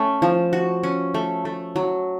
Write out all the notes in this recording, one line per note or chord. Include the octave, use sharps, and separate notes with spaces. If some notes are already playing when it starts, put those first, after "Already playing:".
Already playing: A3 C#4
F3
F#4
C#4
A3
A3
F#3